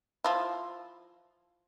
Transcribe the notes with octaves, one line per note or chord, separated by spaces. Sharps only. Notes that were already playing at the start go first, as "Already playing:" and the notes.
F3 E4